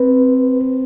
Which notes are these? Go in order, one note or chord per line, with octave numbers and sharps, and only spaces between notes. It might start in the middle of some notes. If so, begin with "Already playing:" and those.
Already playing: C4 B4